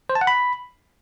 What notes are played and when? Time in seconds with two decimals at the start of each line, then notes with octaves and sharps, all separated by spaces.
0.09 C5
0.15 A5
0.21 F#5
0.27 B5